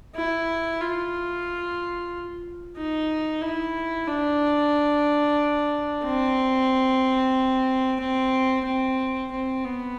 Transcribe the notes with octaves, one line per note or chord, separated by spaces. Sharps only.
E4
F4
D#4
E4
D4
C4
C4
C4
C4
B3